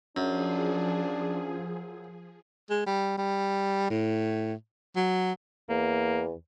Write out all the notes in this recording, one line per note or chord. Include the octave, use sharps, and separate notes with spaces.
F#2 F3 C#4 D4 G#4
G#3
G3
G3
A2
F#3
E2 A#3